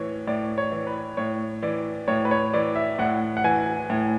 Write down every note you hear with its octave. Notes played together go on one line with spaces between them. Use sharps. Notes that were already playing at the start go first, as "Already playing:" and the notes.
Already playing: A2 E3 C#5
A2 D5
C#5
E3
B4
A2 C#5
E3 D5
A2 C#5
B4
C#5
E3 D5
E5
A2 F#5
F#5
E3 G#5
A2